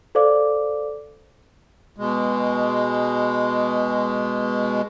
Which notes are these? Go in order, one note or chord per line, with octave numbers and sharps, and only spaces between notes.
A4 C5 D5 F5 D6
B2 G#3